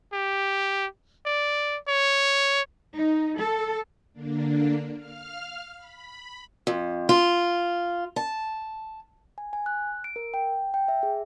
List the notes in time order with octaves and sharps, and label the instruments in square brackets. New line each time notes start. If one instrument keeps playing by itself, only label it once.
[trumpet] G4
D5
C#5
[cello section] D#4
A4
[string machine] D3 A#3 D4
F5 F6
B5
[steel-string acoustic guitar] F2
F4
A5
[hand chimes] G#5
G#5
F#6
D7
A#4
G5
G5
E5
G#4